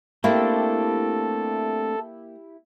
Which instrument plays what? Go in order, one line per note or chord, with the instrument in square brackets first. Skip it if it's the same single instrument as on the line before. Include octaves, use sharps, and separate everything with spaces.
[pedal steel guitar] A3 C4 D4 [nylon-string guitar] A#3 [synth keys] E4 G4 [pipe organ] A4